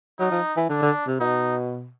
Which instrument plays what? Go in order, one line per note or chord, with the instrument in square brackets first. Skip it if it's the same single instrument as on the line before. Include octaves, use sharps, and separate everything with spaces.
[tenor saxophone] F#3 [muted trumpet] D#4
[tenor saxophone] F3
E3
[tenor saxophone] D3 [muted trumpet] D4
[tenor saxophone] D3
C3
[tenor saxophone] B2 [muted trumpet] D#4